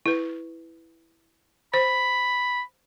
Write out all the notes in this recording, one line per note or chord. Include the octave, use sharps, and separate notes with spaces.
E4 B4
C5 B5